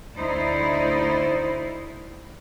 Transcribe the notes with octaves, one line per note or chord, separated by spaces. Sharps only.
D2 D#4 E4 C5 D5